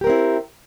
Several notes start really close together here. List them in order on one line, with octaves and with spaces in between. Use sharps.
G4 A#4 C4 E4